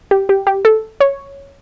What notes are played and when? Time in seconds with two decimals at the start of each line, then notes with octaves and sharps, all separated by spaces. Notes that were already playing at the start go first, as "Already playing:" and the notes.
0.11 G4
0.29 G4
0.47 G4
0.65 A4
1.00 C#5